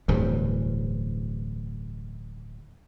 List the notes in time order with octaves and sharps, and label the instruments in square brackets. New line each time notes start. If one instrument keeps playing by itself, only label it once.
[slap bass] D1 E2 G2